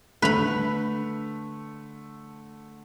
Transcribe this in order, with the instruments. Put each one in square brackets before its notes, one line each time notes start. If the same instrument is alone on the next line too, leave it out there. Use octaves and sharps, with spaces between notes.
[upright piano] D3 A3 F7 [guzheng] B4 B5